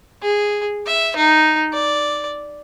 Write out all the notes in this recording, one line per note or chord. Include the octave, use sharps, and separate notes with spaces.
G#4
E5
D#4
D5